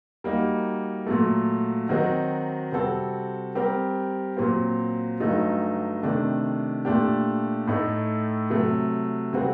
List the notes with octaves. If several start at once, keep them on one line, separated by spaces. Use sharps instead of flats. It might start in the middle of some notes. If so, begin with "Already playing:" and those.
G3 A#3 D#4 F#4
A#2 F#3 A3
D#3 F#3 C4 D#4 F#4
C3 G3 C4 F#4 A4
G3 C4 G4 A#4
A#2 F#3 C4
G2 D3 F#3 A3 D#4
C3 D#3 A3 D4
A#2 A3 D4 G4
A2 A3 D#4
C3 F#3 A3
C3 G3 C4 F#4 A4